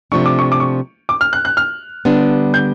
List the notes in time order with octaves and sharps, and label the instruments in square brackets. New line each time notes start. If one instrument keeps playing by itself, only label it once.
[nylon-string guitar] C3 F3 A3 D4 [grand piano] C#6
[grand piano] D6
C#6
D6
C#6
D6
F6
F#6
F#6
F6
[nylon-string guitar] D3 G3 B3 D4
[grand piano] G6